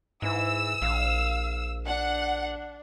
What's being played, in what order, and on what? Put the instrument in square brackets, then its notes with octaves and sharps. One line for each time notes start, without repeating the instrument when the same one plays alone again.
[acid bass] G#2 [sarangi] E3 [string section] E6
[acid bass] A#1 [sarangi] F5
[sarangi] D4 [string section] F#5